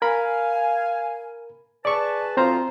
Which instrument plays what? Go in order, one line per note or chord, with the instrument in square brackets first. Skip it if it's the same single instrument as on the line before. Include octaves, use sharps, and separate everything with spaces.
[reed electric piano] A#4 B5 [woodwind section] F5 G#5
[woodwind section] G#4 B4 A5 [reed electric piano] D5 C#6
[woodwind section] D2 F4 F5 [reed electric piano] C4 C5 A#5